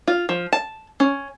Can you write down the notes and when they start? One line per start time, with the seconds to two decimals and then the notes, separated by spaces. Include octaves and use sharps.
0.08 F4
0.29 F3
0.53 A5
1.00 C#4